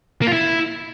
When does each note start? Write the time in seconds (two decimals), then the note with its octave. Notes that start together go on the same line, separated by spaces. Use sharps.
0.22 A#3
0.27 F4
0.33 E4